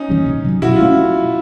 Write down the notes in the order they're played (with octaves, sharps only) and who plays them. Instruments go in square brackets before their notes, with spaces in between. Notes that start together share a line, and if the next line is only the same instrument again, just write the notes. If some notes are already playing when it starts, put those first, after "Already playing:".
Already playing: [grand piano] C#4 D#4
[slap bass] E3 G3 A#3
C3
D#3
F#3
[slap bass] B2 [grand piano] E4 F#4
[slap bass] F#3 A3 C#4 [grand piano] F4